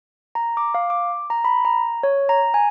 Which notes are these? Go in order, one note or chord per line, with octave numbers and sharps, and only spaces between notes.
A#5
D6
F5
D6
A#5
B5
A#5
C#5
A#5
G#5